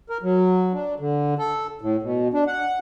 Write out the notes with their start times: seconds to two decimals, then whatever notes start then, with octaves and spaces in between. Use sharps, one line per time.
0.09 A#4
0.23 F#3
0.73 D4
1.00 D3
1.38 A4
1.81 A2
2.02 B2
2.34 D4
2.47 F#5